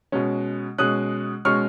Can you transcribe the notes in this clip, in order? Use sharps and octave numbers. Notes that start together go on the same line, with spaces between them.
B2 G#3 C#4
B2 G#3 C#4 D#6 F#6
B2 G#3 C#4 C#6 F6